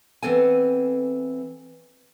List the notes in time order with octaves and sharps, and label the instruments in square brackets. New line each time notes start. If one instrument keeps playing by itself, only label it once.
[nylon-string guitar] E3 B3 C4 A4 G#5